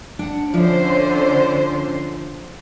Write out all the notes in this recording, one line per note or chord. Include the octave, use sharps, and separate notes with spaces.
D4 F#5
D3 F3 C#4 D4 E4 C5